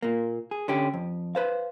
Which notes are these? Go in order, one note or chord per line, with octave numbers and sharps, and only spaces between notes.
A#2 A#3
G#4
D3 C#4 G4
F2
B4 C5 F5